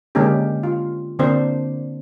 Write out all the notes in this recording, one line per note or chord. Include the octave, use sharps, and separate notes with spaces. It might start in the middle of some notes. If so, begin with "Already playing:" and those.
D3 G#3 A#3 C#4 D4 G4
F4
D3 A#3 C4 D4 C5